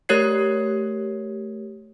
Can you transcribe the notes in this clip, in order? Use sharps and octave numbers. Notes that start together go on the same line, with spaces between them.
A3 G4 A#4 C#5 G#6 C7